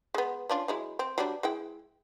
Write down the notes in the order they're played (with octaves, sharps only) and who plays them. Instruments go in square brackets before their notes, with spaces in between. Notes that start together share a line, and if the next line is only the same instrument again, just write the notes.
[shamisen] G#3 B3
C#4 D4 F4
F#3 G#3 E4
C4
F#3 G3 D4
G#3 E4 G5